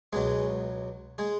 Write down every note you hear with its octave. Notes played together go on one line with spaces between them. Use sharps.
C#2 B2 F#3 G#3 G#4
G#3 G#4